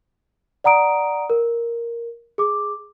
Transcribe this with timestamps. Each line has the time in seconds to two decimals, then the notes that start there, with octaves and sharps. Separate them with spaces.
0.64 D5 F#5 A#5 D#6 D7
1.30 A#4
2.38 G#4 D6